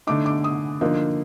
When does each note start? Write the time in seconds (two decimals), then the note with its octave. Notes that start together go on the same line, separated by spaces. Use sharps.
0.07 D3 A3 D#4 D6
0.26 D6
0.44 D#6
0.81 D3 F3 A#3 D#4